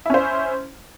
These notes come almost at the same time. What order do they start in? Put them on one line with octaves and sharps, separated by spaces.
E4 C#4 C5